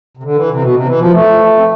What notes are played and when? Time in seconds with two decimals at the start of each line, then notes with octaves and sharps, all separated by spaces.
0.17 C3
0.23 D3
0.36 E3
0.49 C3
0.62 B2
0.74 C3
0.86 E3
0.99 F3
1.12 A3
1.57 C4